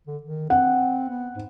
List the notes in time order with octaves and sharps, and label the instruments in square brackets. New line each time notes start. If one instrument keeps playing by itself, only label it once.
[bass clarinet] D3
D#3
[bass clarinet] C4 [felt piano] F#5
[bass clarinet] B3
G#2